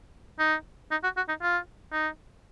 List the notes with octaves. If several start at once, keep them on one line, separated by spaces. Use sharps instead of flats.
D#4
D#4
F#4
F#4
D#4
F4
D#4